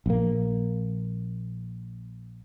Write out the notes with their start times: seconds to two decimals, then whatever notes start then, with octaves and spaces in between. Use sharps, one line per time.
0.06 A#1 A#3